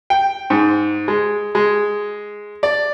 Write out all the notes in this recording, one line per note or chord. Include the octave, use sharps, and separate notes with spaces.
G5
G#2
G#3
G#3
D5